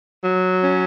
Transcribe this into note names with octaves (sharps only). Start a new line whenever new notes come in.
F#3
C#4